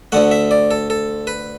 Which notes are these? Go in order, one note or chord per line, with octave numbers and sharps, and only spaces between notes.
D2 D3 A3 F#5
E5
D5
A4
A4
B4